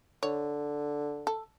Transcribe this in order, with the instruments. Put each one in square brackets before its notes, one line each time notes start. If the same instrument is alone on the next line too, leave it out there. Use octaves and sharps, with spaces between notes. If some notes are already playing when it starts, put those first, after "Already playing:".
[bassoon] D3 [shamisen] C#5
[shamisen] A4